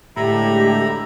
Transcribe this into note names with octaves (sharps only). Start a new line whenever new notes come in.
A2 D3 G#3 G4 E5 A#5 B5